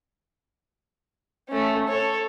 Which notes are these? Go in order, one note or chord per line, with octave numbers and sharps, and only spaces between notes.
A3 C#4
A4 C#5